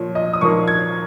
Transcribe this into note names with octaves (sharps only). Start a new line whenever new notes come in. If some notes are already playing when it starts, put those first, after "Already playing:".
Already playing: A#2 F3 C#5
D#5
D#6
A#2 F3 A#3 D#4 C#6
G#6